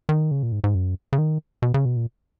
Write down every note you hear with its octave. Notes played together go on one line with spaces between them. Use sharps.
D#3
C#3
A#2
G#2
G#2
F#2
C#3
D#3
B2
C#3
B2
A#2